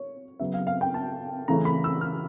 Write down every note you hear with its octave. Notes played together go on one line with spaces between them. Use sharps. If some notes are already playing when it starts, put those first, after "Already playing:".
Already playing: C#5
C#3 F#3 B3 E5
F5
F5
G5
A5
C#3 E3 A3 C#4 A#5
B5
E6
F6